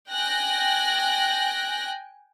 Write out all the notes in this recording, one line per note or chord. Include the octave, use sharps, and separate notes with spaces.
G5 G#5 F#6 A#6